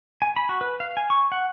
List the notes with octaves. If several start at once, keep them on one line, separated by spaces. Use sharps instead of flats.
G#5
B5
F#4
B4
F5
G#5
C#6
F#5